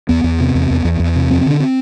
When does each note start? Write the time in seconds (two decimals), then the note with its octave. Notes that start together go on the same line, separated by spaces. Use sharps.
0.09 E2 B3
0.24 E2
0.40 C3
0.55 E2
0.70 E2
0.85 E2
1.00 E2
1.16 C3
1.30 F2 C4
1.41 C4
1.46 D3 D4
1.60 C4